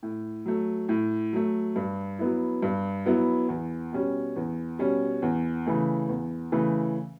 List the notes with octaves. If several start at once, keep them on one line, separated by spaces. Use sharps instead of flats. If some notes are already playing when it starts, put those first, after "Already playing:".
A2
F#3 A3
A2
F#3 A3
G2
F#3 B3 E4
G2
F#3 B3 E4
E2
B2 G3 C#4
E2
B2 G3 C#4
E2
C#3 E3 A3
E2
C#3 E3 A3